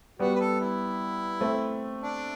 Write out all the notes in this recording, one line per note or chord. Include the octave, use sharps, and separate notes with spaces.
G3 B3 F#4
B4
A4
E4
A3 C4
D4